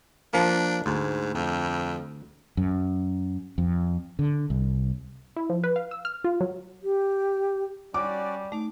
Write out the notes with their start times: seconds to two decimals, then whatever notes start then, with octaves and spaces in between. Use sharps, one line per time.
0.33 F3 A#3 D4
0.86 D2 G#2
1.35 F2
2.57 F#2
3.58 F2
4.19 D3
4.50 C2
5.36 E4
5.50 F3
5.64 B4
5.76 F5
5.91 E6
6.05 F6
6.24 F4
6.41 F#3
6.83 G4
7.94 G3 C#4 F#4 D5 D6
8.52 A3 D#4 D6